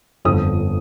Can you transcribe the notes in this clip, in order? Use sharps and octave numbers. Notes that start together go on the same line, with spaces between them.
G1 F2 D3 D#6